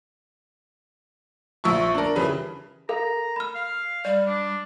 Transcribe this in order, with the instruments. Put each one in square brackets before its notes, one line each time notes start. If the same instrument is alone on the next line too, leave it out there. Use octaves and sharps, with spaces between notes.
[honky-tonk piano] A#1 E5 C#6
D4 A#4
C#3 E3 G3 B4
[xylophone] A4 A#4 F5 [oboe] A#5
[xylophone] B5 F6
[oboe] F5
[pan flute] G3 [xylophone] D5
[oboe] D4